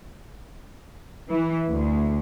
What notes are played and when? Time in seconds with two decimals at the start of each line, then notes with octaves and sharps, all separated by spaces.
1.29 E3
1.68 D2